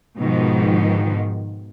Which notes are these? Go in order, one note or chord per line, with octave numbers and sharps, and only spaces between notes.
G#2 B2 D#3 F3